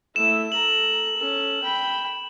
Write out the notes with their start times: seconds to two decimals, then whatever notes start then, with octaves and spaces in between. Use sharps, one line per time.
0.16 A3 E4 E7
0.52 A4 A#5 F#7
1.17 C#4 A4
1.63 G5 B5